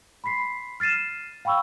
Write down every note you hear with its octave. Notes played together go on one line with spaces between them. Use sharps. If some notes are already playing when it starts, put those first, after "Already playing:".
B5 C6 B6 C7
F6 A6 C7 D#7 E7
F5 G5 B5 C#6 E6